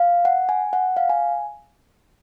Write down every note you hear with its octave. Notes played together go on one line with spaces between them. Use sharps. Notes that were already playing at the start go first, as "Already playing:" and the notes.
Already playing: F5
F#5
G#5
F#5
F5
G#5